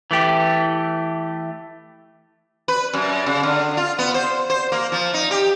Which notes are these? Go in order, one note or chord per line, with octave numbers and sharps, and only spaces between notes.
E3 A3 G4
B4
F#2
C#3
D3
F4
B3
C5
C5
A#3
F3
D#4
G4